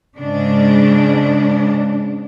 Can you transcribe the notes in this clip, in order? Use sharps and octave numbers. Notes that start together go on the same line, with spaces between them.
G#2 C#3 D4